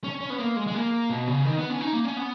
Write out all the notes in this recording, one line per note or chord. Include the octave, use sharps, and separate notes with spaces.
C#4
C#4
B3
A#3
G#3
G#3
A#3
B2
C#3
D#3
B3
C#4
D#4
A#3
C#4
B3